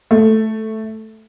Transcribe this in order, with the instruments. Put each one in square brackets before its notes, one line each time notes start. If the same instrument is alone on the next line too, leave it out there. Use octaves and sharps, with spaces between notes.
[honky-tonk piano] A3